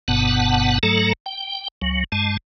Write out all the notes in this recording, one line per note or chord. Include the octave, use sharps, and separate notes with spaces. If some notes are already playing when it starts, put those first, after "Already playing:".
G1 G2 B2 B3 F#5 A5
G#2 F#3 A3 A4 A#5
G5
C#2 F#3
G2 G#3 A5